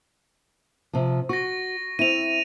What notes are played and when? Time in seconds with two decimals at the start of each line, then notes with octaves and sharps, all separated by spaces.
0.93 C3 F3
1.29 F#4 C#6 A#6
1.99 C4 E4 D#7 F7